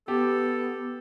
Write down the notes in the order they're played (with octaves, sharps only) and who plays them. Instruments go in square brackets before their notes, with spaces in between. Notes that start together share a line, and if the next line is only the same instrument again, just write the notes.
[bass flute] B3 [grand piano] G4 [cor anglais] A4